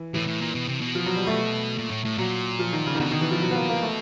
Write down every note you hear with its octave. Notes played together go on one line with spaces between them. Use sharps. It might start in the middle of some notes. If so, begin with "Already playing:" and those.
Already playing: E3
A2 E3
A2
A#2
B2
C3
B2
F3
F#3
G3
A3
A#2
A2
A2
A#2 F#3
F3
D#3
C#3
D#3
B2 D3
D#3
E3
F3
F#3
B3
A#3
A#3
A3